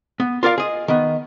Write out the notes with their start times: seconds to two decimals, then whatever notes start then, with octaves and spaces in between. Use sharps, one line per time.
0.20 B3
0.43 F4 A#4 D5 F5
0.58 G#4 D#5
0.88 D#3 B3